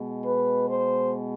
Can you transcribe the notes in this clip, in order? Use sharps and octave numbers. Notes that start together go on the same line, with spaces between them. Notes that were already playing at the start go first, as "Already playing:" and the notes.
Already playing: B2 G#3
B4
C5